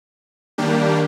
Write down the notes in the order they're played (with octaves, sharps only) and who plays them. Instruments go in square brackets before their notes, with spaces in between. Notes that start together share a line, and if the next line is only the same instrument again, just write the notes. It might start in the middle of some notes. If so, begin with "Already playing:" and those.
[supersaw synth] D#3 G3 A#3 D4 G4